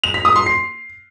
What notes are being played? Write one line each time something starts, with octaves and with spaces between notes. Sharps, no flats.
F7
B6
D#6
C6
C7